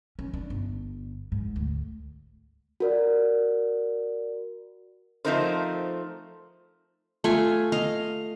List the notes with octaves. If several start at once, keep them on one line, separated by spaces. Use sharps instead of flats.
C#4
D4
G1
G#2
D2
F#4 A#4 D5
F3 A3 C4 D#4 A#4 C5
A3 F4 G#5
D#5 F5